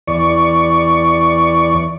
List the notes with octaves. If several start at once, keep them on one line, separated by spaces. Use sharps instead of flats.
E2 D5 C#6